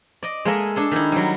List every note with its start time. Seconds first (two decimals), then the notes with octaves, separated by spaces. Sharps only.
0.23 D5 D#5
0.45 G#3 A#3 G#4 A4 D#5 E5
0.76 D4 G#4 A4
0.91 D#3 D#4 E4
1.12 F#3 G3